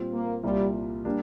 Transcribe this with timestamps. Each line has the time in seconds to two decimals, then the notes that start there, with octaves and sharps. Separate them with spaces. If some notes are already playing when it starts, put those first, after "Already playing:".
Already playing: A#2 G3 C4 F4
0.12 A#3
0.44 C2 A#2 G3 A#3 F4
1.05 G3 A#3 D4